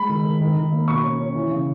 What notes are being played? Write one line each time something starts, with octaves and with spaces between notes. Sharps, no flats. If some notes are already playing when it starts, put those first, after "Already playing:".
Already playing: G#3 B5
D#3
D#3
D#3
D#3
A#3
B2 C#6
C#4
C#4
E3
C#3